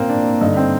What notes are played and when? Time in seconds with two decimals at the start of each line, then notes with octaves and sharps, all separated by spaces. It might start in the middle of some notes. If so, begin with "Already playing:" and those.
Already playing: A#2 A#3 C4
0.09 D4
0.41 G2 D3 D#4
0.57 C4